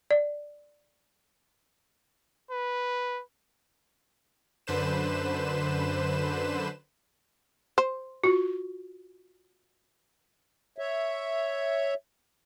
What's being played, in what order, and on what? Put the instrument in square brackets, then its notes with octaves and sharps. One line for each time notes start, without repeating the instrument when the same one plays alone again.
[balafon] D5
[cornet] B4
[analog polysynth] F#2 D3 B4 C5 E7
[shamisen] C5
[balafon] F4 F#4
[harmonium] C#5 E5